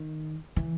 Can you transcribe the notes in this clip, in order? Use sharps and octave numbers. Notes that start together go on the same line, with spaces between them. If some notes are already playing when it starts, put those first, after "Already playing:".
Already playing: D#3
E3